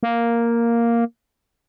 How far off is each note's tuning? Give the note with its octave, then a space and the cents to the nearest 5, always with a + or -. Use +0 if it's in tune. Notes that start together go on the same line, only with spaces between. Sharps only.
A#3 +0